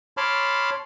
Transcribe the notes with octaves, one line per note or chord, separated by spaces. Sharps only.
C#5 A5 B5 C6 D6 F6